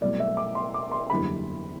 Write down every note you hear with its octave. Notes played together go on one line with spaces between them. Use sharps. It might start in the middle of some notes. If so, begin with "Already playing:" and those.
C2 B2 F#3 A3 D5
E5
D6
C6
D6
C6
F#1 E2 D3 G3 B5